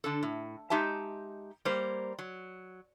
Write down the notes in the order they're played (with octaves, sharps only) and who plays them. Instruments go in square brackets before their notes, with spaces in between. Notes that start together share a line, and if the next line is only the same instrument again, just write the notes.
[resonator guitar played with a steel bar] D3 D4 A4
A2
G#3 D#4 G4 E5 A5
G3 A#3 C5
F#3